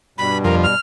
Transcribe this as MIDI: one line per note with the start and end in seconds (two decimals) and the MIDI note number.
0.18 0.75 43
0.18 0.75 47
0.18 0.75 55
0.18 0.38 83
0.44 0.66 41
0.44 0.56 70
0.63 0.80 89